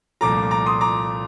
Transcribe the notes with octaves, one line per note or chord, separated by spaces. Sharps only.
C2 A#2 F3 A3 A#5 D6
A#5 D6
C6 D#6
A#5 D6